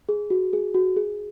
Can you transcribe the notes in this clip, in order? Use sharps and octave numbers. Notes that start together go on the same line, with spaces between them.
G#4
F#4
G#4
F#4
G#4